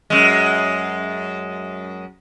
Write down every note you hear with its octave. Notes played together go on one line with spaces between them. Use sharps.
F#2 G#3